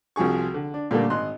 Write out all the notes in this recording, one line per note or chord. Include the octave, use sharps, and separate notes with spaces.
C2 F3 F#4 G#4 C#6
D3
D4
A#2 D3 G3 A3 A#3
G#1 D#5 C6 F#6